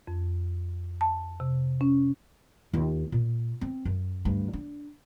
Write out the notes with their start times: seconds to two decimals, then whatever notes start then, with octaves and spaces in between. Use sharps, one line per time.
0.07 F2
1.01 A5
1.40 C3
1.81 C#4
2.73 D#2 F4
3.12 A#2
3.61 C4
3.85 F#2
4.25 D2 G2
4.53 D4